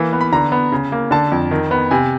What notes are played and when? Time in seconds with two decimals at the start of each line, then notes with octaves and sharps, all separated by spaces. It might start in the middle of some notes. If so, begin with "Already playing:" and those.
Already playing: E3 A#3
0.13 B3
0.21 B5
0.33 D3 A#5
0.52 B3
0.72 C#3
0.92 A#3
1.11 D3 A5
1.31 F2
1.51 D#3
1.71 B3
1.91 C3 G#5